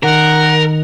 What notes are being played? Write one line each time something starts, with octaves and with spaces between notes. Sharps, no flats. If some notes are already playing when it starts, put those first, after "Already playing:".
D#3 A#4 F#5